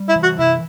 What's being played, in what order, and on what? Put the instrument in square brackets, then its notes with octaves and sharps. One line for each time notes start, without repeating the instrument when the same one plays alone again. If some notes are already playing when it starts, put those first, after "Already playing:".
Already playing: [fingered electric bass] G3
[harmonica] E4
[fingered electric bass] E3
[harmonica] F#4
[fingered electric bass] C3 [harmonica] E4